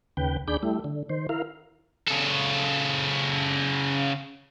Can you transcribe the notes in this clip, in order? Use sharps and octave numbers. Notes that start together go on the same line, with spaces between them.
D#2 C#3 B4 G5
D#2 D4 G#4 D5 B5 G6
G3 A3 E4
D3
D#3 C5
E4 A#4 F5
C#3 A4